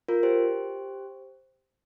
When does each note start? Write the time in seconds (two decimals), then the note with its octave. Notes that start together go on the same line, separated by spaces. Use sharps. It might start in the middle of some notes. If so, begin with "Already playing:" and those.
0.08 F4 A#4
0.23 G4 C5